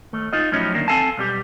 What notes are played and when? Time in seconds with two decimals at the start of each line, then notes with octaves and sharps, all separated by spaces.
0.13 D#2 A3
0.33 D#4 F4 D#5
0.52 A2 F3 F#3 C#4 D#4 E4
0.74 D2 D#3 A#3 D4
0.88 C4 D#4 A4 F5 G#5 A5
1.17 B1 G3 G4